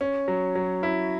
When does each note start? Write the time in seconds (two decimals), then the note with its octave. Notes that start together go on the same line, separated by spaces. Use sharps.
0.01 C#4
0.28 F#3
0.55 F#3
0.83 E4